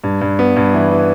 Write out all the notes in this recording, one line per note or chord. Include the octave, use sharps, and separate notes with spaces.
G2
G2
B3
G2
E3
E3